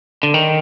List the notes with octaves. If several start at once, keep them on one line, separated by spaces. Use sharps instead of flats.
D3
D#3